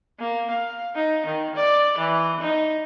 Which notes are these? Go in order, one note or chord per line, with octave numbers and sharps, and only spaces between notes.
A#3
F5
D#4
D#3
D5
E3
D#4